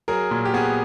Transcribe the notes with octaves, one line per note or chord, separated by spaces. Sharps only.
F#3 G#4 A#4
A#2
G4
B3 F#4 G#4